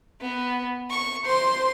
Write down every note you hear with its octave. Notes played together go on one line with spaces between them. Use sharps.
B3
C#6
C5 C6